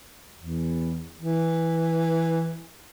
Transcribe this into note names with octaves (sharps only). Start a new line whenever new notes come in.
E2
E3